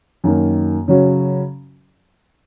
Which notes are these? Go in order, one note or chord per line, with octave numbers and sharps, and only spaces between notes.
F#2 D#3 A#3
C#3 F#3 C#4 F#4